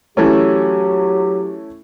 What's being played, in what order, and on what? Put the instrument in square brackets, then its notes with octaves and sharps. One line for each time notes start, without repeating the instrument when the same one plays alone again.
[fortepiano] E3 A3 C#4 [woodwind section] F#3 G4